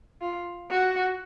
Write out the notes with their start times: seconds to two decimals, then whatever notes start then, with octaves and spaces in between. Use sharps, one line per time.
0.21 F4
0.71 F#4